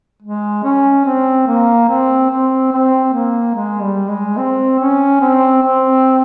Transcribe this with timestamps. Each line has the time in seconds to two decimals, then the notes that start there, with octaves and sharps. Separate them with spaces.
0.22 G#3
0.64 C#4
1.05 C4
1.47 A#3
1.88 C4
2.30 C4
2.72 C4
3.13 A#3
3.55 G#3
3.82 G3
4.10 G#3
4.37 C4
4.79 C#4
5.21 C4
5.62 C4